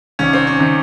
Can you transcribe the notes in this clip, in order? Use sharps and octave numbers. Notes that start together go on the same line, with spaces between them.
C2 C3 D#3 C#4
C4
C#4
C3 D#3